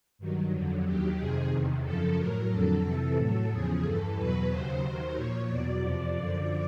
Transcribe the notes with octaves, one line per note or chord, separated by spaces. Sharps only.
G2 D#3 F#3
F2 D3 F#3
D#2 D#3 F#3 G4
F2 C3 D#3 G#4
E2 C3 D#3
F#2 C#3 F3 A4
A2 F#3 A#4
F2 D3 F#3 A4
F2 C3 E3
A2 F#3 A4
E2 C#3 F3 G#4
G2 E3 A4
E2 B2 F#3 B4
D#2 C#3 F#3 C5
D#2 D#3 F#3 C5
A#2 F3 C#5
E2 B2 F#3 D5
F2 C3 F3 D5
F#2 D3 F3